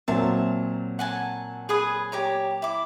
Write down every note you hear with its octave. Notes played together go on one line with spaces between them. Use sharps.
A#2 F#3 C4 E5 A5
F#5 G#5 A5
G#4 B4 D#6
G4 C#5 A#5
E4 D6